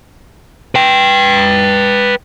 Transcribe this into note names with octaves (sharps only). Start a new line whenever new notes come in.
B4 G5